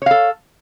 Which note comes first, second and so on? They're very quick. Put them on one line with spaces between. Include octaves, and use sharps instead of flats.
C#5 F5 A4